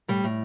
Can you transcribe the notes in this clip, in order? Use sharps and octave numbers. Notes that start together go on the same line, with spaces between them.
A2 G3
A2